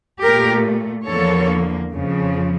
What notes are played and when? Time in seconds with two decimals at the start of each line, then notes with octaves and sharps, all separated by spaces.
0.22 A#2 A3 G4 A#4
1.07 E2 D3 F3 A#3 A4 C#5
1.92 F2 C#3 F3